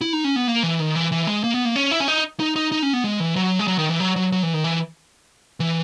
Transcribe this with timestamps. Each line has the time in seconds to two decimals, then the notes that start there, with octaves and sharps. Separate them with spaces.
0.01 E4
0.13 D#4
0.24 C#4
0.36 B3
0.47 A#3
0.63 E3
0.79 D#3
0.95 E3
1.12 E3
1.27 G#3
1.44 A#3
1.54 B3
1.65 A#3
1.76 C#4
1.91 E4
2.00 C#4
2.08 D#4
2.40 D#4
2.56 D#4
2.72 D#4
2.83 C#4
2.93 B3
3.04 G#3
3.20 E3
3.36 F#3
3.59 G#3
3.68 F#3
3.79 D#3
3.89 E3
4.00 F#3
4.16 F#3
4.32 F#3
4.43 E3
4.54 D#3
4.64 E3
5.60 E3